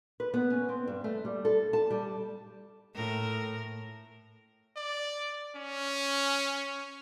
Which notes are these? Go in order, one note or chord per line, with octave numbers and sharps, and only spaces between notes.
B4
B3
C#4
C4
G2
A3
G3
A4
A5
G3
A2 A#4
D5
C#4